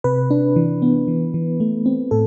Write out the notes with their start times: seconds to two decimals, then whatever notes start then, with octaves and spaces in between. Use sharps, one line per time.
0.04 C3 B4
0.30 D4
0.56 E3
0.82 B3
1.08 E3
1.34 E3
1.60 A3
1.86 C4
2.11 A2 A4